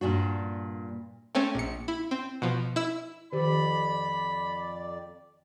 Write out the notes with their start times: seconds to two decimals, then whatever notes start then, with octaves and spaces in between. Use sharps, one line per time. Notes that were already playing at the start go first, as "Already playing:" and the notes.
0.01 G2 A#2 D4 F#4
1.35 A3 C4 C#4
1.55 A#1 C#7
1.88 E4
2.11 C4
2.42 B2 F3
2.76 E4 E5
3.33 F2 D#3 G4 D5 B5